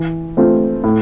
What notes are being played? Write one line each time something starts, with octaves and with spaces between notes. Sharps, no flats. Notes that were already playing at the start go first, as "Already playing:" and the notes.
Already playing: E3
A3 C4 F4
A2